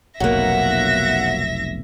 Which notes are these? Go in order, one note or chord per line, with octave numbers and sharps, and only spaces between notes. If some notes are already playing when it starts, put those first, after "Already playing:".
F1 B1 B2 F#3 A#3 E5 F#5 A#6